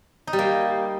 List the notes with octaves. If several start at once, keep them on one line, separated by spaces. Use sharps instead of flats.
D#4
G3
A#3